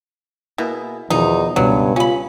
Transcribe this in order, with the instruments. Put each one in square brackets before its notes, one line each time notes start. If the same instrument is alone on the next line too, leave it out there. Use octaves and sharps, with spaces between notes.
[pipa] B2 [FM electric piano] A#3 E4 G#4
[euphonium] E2 [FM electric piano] B2 D#3 F3 [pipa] D#4
[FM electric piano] C#2 B2 G#5 [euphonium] G2 [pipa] F#3
[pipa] C#4 B5 [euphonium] F4